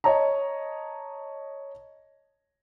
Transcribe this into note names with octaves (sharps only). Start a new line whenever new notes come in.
C#5 D#5 A5 A#5